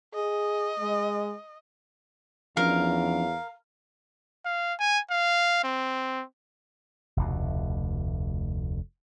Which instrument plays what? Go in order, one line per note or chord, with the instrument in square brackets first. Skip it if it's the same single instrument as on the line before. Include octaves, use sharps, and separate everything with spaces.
[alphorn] G#4 [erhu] D#5
[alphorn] G#3
[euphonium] E2 [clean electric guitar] F3 C#4 D4 [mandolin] A#4 [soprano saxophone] F5
[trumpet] F5
G#5
F5
C4
[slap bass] F1 D2 B2